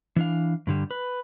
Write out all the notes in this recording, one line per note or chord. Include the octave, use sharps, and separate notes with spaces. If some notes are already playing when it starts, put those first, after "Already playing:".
E3 D4 F5
G2 D3 G3
B4